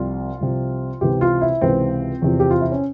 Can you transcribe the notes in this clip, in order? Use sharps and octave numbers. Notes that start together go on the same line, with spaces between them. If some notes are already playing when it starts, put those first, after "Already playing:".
Already playing: C2 C3 F3 F4
C2 C3 F3
C#2 C3 E3 G4
F4
E4
C#2 C3 E3 C4
E2 C3 F3
G4
F4
E4
C#4